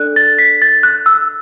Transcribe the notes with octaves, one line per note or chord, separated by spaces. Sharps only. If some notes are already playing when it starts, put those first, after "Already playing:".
Already playing: D4 A4 D5 F#6
A6
B6
A6
F#6
E6